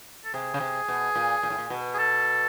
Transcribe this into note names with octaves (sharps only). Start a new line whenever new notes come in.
A4
C3 G#4
C#3
C3
B2
A#2
A#2
A2
A#2
B2
G#4
A4